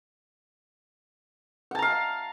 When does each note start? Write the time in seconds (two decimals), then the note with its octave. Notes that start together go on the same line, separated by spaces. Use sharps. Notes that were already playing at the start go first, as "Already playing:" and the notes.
1.71 F#5
1.75 A5
1.79 A#5
1.82 F5